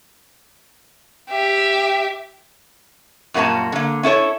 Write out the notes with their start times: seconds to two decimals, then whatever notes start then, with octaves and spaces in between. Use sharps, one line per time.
1.30 G4 E5
3.34 F#2 A#2 G3 A#3 C#4 A5
3.72 D3 A#3
4.03 C#4 E4 A4 C#5